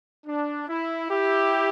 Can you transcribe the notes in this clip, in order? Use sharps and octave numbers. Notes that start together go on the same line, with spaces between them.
D4
E4
E4 G4